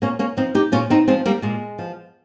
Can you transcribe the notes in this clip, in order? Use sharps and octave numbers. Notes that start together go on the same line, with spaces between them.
A#2 A#3 C#4
A#3 C#4
F3 C4 D#4
D#4 G4
A#2 C#4 F4
C4 D#4
F3 G#3 C4
G3 A#3
A#2 G#3
F3